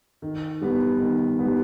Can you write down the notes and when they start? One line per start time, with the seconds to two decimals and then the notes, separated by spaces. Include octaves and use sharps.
0.22 D#3
0.61 G3 B3
1.00 D#3
1.39 G3 B3